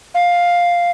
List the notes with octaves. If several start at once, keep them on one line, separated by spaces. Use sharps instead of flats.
F5